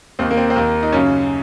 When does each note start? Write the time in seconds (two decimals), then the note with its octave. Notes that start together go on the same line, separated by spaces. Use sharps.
0.19 D#2 D#3 C4
0.31 A#3
0.37 C4
0.50 C4
0.56 D#2 D#3 A#3
0.83 D#4
0.92 F#2 C#3 C#4